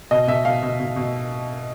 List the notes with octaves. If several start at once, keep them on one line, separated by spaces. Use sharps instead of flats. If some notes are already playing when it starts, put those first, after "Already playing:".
B2 D#5
B2 E5
B2 F5
B2
B2
B2